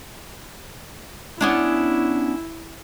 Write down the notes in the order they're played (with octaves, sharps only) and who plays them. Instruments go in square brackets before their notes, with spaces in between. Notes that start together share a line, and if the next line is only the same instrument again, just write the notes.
[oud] B3 C#4 D4 [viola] E4